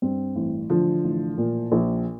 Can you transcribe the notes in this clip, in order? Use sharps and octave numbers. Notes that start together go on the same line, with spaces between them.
G2 C4
A1
D3 F3
A1
A#2
A#1